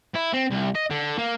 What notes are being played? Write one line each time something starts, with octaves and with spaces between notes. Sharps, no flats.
E4
C4
C2
D#5
D3
A#3